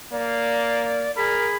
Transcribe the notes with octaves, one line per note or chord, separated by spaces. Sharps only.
A#3 D5
G#4 A#4 B5